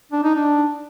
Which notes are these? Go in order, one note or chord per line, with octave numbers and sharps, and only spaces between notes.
D4
D#4
D4